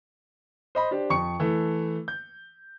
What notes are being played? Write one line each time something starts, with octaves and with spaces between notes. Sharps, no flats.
C5 D#5 B5
D4 G4 C5
F2 C#6 C#7
E3 A3
G6